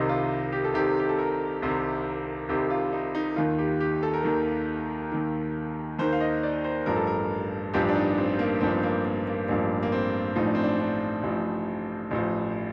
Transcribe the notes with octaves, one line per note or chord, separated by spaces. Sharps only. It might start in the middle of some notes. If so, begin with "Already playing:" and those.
Already playing: C2 C3 D#3 D#5
F4
G4
A4
C2 C3 D#3 G4
G4
A4
A#4
C2 C3 D#3
C2 C3 D#3 G4
F4
D#4
D#4
D#2 D#3 F4
G4
G4
A4
A#4
D#2 D#3 A4
D#2 D#3
D#2 D#3 C5
F5
D#5
D5
C5
A1 G2 F3 A#4
A4
A#4
A1 G2 F3 G4
D4
D#4
C4
A#3
A1 G2 F3 C4
C4
A#3
A#3
A#3
A1 G2 F3 A#3
A#3
C4
A1 A2 F3 D#4
D4
C4
D4
D4
A1 A2 F3
A1 A2 F3